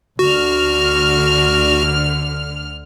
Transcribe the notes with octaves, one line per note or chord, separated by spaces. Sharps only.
D2 D3 F#4 F6